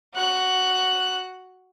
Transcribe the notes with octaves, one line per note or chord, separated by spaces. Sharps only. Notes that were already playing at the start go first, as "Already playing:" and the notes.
F#4 F#6